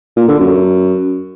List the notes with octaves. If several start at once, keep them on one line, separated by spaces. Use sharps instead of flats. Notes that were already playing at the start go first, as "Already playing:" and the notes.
A#2
D3
F#2